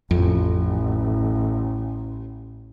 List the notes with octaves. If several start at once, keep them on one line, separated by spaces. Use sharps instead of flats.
A1 F2